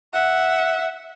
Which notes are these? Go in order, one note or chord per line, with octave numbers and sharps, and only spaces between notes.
E5 F#5